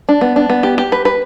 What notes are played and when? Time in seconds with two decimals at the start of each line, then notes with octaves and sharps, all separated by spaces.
0.09 D4
0.21 B3
0.36 D4
0.50 B3
0.63 G4
0.78 G4
0.92 B4
1.05 B4